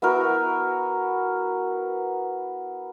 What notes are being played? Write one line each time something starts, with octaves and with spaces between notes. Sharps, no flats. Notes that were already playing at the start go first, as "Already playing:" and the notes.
B3 E4 F#4 A#4